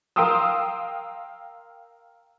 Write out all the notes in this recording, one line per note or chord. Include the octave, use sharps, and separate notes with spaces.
A#4 F5 G5 C6 D#6 E6